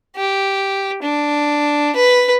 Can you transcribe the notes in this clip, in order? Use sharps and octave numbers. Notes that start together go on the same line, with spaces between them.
G4
D4
B4